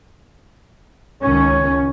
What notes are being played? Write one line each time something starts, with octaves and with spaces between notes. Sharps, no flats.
C#2 D#3 C#4 C#5